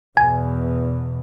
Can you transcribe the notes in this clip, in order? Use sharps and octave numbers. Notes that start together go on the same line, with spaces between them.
E2 B2 G#5